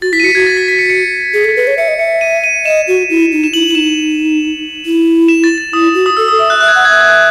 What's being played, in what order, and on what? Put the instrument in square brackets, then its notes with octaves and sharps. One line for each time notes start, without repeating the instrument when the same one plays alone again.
[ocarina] F#4 [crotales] A6
[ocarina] E4 [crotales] B6
[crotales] D#7
[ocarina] F#4 [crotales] C#7
[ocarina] F#4 [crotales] G#6
[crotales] A6
B6
B6
C#7
C#7
[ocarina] G#4
A4
B4
C#5
[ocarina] E5 [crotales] C#7
[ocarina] D#5
[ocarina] E5 [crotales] C#7
[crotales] D#7
D#7
[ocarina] D#5 [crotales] E7
[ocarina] F#4
E4
D#4
[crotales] E7
[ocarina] E4 [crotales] F#7
[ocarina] E4 [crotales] F#7
[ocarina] D#4 [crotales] E7
[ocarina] E4
[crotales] E7
A6
A6
[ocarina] E4 [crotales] D#6
[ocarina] F#4
[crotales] D#6
[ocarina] A4 [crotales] E6
[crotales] D#6
[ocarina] E5 [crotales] D#6
[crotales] F#6
[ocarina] E5 [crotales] F#6
[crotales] G#6
[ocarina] F#5 [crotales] F#6
[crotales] G#6
[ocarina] E5 [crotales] F#6
[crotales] G#6
F#6